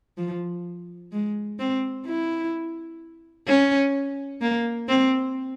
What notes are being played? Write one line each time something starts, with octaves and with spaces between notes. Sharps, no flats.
F3
G#3
C4
E4
C#4
A#3
C4